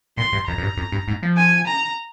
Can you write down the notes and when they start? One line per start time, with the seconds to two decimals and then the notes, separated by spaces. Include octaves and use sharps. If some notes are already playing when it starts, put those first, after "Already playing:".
0.17 A#2 C6
0.33 G2
0.48 F2 A#5
0.58 F2
0.62 G2
0.77 F2
0.92 G2
1.08 G#2
1.23 F3
1.37 G#5
1.67 A#5